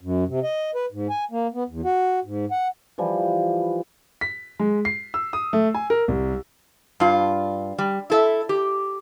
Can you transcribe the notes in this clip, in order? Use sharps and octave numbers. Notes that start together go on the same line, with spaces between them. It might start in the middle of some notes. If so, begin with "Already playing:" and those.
F#2
C3
D#5
B4
G#2
G#5
A#3
B3
E2
F#4
G#2
F#5
E3 F3 G3
B6
G#3
C7
E6
D#6
A3
G#5
A#4
C2
G2 F4
G3
E4 A4 E5
G4